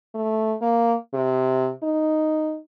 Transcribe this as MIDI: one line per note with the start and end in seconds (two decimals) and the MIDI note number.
0.14 0.55 57
0.62 0.95 58
1.14 1.70 48
1.83 2.58 63